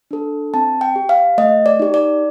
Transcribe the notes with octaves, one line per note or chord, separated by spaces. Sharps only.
D4 A4
C4 A5
G5
G4
F5
A3 D#5
D5
D#4 G4
D5